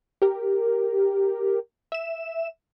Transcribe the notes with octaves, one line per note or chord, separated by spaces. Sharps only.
G4 A#4
E5 E7